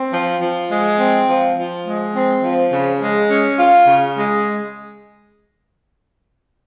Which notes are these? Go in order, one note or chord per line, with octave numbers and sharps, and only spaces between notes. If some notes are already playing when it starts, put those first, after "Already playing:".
Already playing: C4
F3
F3
G#3
C4
F3
F3
G#3
C4
F3
C#3
G#3
C#4
F4
C#3
G#3